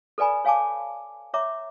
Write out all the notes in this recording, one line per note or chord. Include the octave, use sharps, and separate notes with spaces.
A4 B4 D5 G#5 B5
C#5 F5 G#5 A5 D6
C#5 E5 A#5 D6